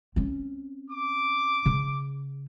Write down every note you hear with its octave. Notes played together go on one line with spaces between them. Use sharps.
C4 C#4
D6
C#3